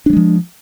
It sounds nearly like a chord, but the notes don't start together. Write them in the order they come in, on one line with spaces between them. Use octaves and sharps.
D4 F#3 G#3 F3